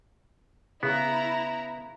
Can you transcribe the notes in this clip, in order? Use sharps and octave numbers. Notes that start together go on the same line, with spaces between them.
C#3 B3 E4 A#5